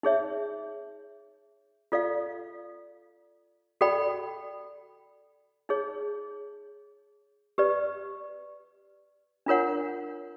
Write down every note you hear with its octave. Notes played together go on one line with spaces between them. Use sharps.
D#4 G#4 C#5 E5
F4 A4 D5 F5
F#4 A4 D5 G5 B5
D#4 G#4 C#5
G4 B4 D5
D4 F4 A#4 C#5 F#5